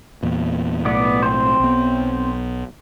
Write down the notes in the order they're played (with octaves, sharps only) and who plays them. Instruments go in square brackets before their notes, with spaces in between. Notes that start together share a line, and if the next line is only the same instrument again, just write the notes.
[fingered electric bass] E2 A#2
[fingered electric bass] B1 A2 [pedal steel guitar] B3 D5
[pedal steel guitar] C4 C5
[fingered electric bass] B1 B3